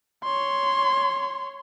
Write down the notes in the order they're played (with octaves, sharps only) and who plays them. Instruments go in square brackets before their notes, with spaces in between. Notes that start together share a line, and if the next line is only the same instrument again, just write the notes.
[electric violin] C#5 C6